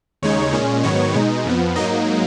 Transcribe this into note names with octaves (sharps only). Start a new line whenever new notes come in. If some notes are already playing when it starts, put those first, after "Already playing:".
D#2 C#3 G#3 D#4 C#5
A#2 G#3 C#4
G#2 D#3 F#3 B3 C#5
B2 G#3 D#4
F2 F3 B3
G#2 F#3 A#3 D#4 D#5